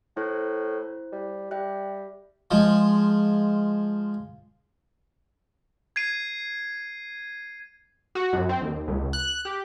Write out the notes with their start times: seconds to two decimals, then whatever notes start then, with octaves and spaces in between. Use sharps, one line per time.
0.17 A2 E4 C5
1.12 G3
1.51 G3 E5 G5 F#6
2.51 F3 G#3
5.96 G#6 C7 D#7
8.15 F#4
8.33 F#2
8.49 C4
8.61 D#2
8.88 C#2
9.13 F#6
9.45 G4